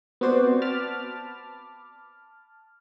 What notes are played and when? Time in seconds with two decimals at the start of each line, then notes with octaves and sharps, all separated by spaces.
0.21 B3 C4 F#4 C5 D5
0.62 A5 B5 D6 F6 A6